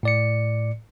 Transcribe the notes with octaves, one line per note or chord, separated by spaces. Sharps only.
A2 D5 C#7